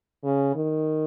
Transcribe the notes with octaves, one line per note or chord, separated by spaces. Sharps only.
C#3
D#3